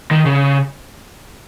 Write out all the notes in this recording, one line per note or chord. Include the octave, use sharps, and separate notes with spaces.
D#3
C#3